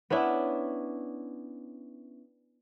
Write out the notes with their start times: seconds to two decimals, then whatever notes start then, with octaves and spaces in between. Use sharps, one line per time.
0.10 B3 C#4 D4 E4